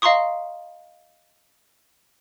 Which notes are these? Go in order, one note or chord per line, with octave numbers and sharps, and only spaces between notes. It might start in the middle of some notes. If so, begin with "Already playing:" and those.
D#5 F5 A#5 C6 C#6 D#6